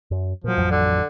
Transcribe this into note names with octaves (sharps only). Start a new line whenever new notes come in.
F#2
A#2 F3 F#3
A1 F2 F#3
D3